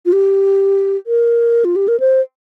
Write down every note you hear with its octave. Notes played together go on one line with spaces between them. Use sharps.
F4
G4
A#4
F4
G4
A#4
C5